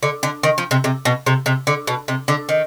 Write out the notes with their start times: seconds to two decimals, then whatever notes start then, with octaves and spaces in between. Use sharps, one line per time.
0.03 D3
0.23 D3
0.43 D#3
0.58 F3
0.71 C3
0.84 C3
1.05 B2
1.26 C3
1.46 C3
1.67 D3
1.87 B2
2.08 C3
2.28 D3
2.49 D#3